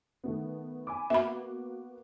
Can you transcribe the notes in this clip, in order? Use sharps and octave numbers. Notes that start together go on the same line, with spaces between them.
D#3 A3 B3
G#5 B5 D6
A#3 B3 F#4 E5 B5